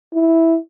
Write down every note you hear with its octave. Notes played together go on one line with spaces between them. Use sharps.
E4